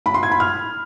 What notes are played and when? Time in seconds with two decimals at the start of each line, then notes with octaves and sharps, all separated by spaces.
0.06 B5
0.14 C6
0.23 G#6
0.31 B5
0.40 F6